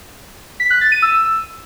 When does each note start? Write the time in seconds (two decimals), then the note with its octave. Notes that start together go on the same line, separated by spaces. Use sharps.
0.60 B6
0.70 F#6
0.81 A6
0.92 D#7
1.02 E6